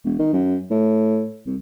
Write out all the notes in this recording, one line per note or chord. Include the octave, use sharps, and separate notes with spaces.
E1
D#3
F#2
A2
C2